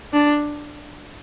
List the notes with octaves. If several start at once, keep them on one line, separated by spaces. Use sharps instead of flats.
D4